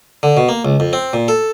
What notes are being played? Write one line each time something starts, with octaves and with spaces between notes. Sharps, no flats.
D3
B2
A#3
C#2
F2
C4
A#2
A4